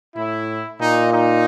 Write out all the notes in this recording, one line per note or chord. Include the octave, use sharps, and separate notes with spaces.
A2 E4
A#2 D#4
D#4